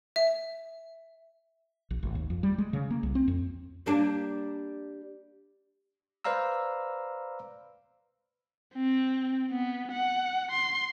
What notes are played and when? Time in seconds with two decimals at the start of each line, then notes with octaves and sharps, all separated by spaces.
0.16 E5
1.90 A#1
2.03 G#1
2.15 D#2
2.30 F2
2.43 G3
2.58 G#3
2.73 C#3
2.90 A#3
3.03 C2
3.15 C4
3.28 F2
3.86 G3 A#3 D4
6.24 B4 C5 D5 F5 A#5 E6
8.75 C4
9.51 B3
9.93 F#5
10.52 C6